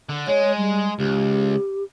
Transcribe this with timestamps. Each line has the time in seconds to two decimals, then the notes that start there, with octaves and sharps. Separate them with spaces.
0.09 D3
0.27 G#3 C#5
0.57 G3
0.99 C#2 G4